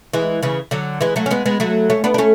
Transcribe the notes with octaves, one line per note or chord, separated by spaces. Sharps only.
E3 G#3
C#3 E3
D3 F#3
E3 G#3
F#3 A3
C#4
G#3 B3
G#3 B3
F#3 A3
A3 C#4
B3 D4
D4
A3 C#4